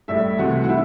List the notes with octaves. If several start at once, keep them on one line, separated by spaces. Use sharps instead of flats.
A1 A2 G3 E5
C2 C3 E3 A3 F#4
F#4
E4